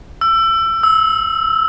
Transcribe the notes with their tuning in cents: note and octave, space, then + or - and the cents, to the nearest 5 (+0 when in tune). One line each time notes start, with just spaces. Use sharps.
E6 +25
E6 -20